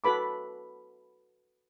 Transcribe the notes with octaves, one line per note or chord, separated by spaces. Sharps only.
F#4 A4 B4 B5 D6